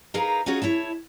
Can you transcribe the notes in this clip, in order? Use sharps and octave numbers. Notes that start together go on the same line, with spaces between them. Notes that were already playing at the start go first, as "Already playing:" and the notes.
D#4 G#4 A#4 B4 F5 A#5
C#4 D#4 F4 F#4 G#4 C#5
E4 C#5 E5 A5